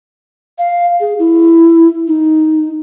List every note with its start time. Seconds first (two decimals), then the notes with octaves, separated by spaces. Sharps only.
0.58 F5
1.00 G#4
1.19 E4
2.07 D#4